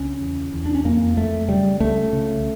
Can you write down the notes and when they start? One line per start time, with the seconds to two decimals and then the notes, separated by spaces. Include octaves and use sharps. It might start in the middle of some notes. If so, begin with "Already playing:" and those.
Already playing: C#2 C#4
0.21 E2
0.53 E2
0.66 D4
0.75 C#4
0.85 F2 A#3
1.17 F2 A3
1.49 C#3 G3
1.80 C#2 A3
2.13 C#3